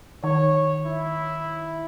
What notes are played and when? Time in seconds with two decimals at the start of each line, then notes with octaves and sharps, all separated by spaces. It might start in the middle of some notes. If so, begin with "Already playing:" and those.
0.24 D#3 C#5
0.86 E4